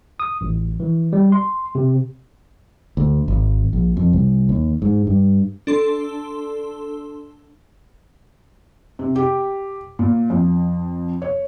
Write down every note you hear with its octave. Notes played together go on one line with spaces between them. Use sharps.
D#6
A1
E3
G3
C6
C3
D2
G#1
A#1
F2
C2
D#2
G#2
G2
D4 A4 C6
C3
G4
A#2
F2
C#5